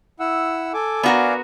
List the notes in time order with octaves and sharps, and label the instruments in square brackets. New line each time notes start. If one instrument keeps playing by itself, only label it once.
[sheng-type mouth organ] E4 F#5 E6
A4 G#5 D6
[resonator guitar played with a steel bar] B3 F#4 A#4 [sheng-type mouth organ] D5 F5 G#5